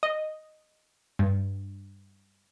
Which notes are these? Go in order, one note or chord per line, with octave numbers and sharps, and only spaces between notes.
D#5
G2